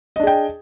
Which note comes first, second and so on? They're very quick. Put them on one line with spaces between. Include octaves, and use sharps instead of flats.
D#5 D4 G#4 G5